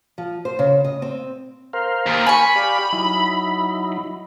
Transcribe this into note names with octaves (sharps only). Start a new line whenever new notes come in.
F3
C5
C#3
D#5
C4
A#4 C5 F5
D#2
G#5 B5 C#6
G4 D5 F5
F#3 D#4 E4